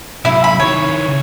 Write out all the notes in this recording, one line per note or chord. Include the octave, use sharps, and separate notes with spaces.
C3 F#3 E4
B5
D#3 E4 C#5
C#2 C#3